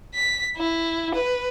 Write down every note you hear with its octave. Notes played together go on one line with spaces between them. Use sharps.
B6
E4
B4